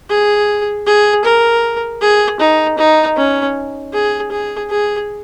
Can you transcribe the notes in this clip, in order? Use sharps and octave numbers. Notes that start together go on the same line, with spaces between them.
G#4
G#4
A#4
G#4
D#4
D#4
C#4
G#4
G#4
G#4